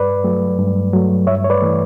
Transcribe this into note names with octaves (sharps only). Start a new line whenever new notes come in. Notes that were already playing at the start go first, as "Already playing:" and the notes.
Already playing: G2 B4 D5
F#3 A3
G2
F#3 A3
G2 C#5 E5
C#5
B4 D5
E3 A3